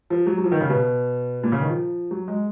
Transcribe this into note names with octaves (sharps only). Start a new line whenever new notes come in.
F3
F#3
F#3
F3
D#3
C#3
B2
A#2
C#3
D#3
F3
F#3
G#3